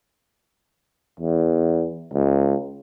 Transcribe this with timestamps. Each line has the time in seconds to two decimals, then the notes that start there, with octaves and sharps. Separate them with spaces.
1.20 E2
2.13 C#2